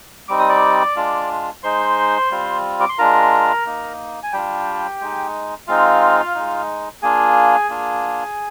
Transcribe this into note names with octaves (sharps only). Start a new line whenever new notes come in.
G3 C4 D#4 D6
D#6
D5 D6
G#3 D4 F4
G#3 D#4 C5 C6
G3 C4 F4
D6
C6
G#3 D4 F4 A#4 A#5
A#3 D#4
G#5
G3 D4 F4 G4 G5
G#3 D#4
G#3 C4 D#4 F4 F5
G#3 D#4
A#3 D4 F4 G#4 G#5
A#3 D4 F4